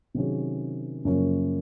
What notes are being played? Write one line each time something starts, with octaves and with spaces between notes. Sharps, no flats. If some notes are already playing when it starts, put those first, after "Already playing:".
C3 D#3 F#3 C#4 G#4
F#2 C#3 F3 A#3 C#4